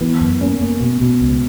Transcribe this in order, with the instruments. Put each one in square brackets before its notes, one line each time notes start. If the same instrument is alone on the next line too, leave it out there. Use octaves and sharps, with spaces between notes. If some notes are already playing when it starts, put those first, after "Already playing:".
[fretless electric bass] E3 [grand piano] B3
[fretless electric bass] F#2
[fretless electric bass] A#3 [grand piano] C#4
[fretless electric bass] A#3
B2
B2
C#2